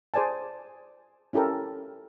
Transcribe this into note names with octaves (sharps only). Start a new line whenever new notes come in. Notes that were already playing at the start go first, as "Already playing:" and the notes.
G#4 C5 D5 G#5 A5
C#4 E4 G4 A4 A#4